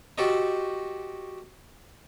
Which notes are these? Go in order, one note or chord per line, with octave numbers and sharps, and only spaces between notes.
F#4 G4 A4 C5 D#5